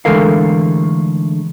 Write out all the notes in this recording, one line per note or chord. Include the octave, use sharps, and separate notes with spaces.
D3 E3 G#3 A3 A#4 F5